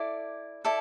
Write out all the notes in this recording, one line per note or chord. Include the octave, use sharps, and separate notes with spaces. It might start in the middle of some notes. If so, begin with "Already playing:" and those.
Already playing: E4 A4 D5 D6
E4 A4 D5